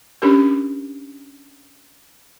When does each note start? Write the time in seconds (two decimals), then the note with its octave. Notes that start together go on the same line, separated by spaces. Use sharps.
0.22 C#4 D4 G4 A#4